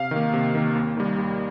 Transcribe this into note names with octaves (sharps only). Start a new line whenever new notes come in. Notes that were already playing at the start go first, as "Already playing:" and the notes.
Already playing: C3 F5
D#3 A#3
C3
D#3 A#3
D#2
D#3 G3
D#2